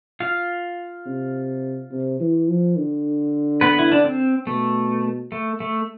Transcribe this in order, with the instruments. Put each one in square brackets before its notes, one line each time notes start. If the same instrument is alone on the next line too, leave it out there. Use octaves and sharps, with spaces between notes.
[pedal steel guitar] F4 F5
[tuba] C3
C3
E3
F3
D3
[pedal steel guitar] B3 B4
E4
D4
C4
[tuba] B2 [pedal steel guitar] A3
[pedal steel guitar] A3
A3